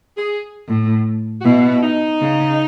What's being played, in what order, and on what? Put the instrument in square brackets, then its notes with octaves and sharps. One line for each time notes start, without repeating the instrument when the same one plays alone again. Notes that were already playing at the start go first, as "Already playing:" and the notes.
[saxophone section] G#4
[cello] A2
[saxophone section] F#4
[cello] B2 [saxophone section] E4
[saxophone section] D#4
[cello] C#3